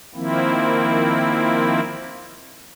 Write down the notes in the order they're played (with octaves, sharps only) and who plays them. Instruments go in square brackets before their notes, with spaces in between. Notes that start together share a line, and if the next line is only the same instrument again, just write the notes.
[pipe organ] D#3 F3 A#3 C4 E4